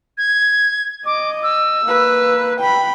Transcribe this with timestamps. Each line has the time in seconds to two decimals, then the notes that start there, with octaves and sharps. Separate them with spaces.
0.18 G#6
1.06 D#5 D6
1.43 E6
1.84 A#3 B4
2.60 G5 B5